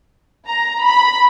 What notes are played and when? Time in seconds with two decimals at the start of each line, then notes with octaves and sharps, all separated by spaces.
0.47 A#5
0.83 B5